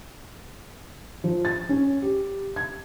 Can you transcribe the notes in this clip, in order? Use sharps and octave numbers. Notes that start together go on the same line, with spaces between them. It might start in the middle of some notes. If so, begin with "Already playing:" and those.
F3
A6
C#4
G4
G#6